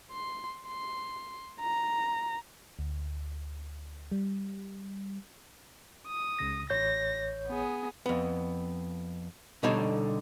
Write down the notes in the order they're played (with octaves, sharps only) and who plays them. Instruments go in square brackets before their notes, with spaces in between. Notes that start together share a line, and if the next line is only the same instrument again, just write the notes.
[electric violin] C6
C6
A#5
[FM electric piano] D2
G3
[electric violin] D#6
[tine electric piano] C#2 C#3 A#6
[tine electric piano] A1 C#5 G6 [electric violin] A#6
[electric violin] B3 G#4
[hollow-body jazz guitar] F2 B3
B2 D3 G3 D#4 A4 C#5